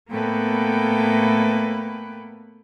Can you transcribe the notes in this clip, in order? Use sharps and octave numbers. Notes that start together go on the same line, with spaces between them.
A2 A#3 B3 A4 B4 G5